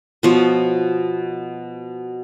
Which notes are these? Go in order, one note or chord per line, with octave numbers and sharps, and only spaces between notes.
B2 F3 C#5